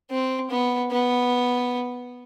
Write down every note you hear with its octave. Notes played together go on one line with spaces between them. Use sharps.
C4
B3
B3